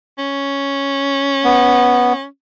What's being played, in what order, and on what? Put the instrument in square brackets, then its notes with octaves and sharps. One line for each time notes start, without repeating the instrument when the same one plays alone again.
[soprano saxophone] C#4
[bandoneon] B3